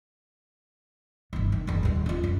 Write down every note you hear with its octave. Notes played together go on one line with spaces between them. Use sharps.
G1 E3
D#3
F#1 E2
D#1 E2
C#4 F4
F#2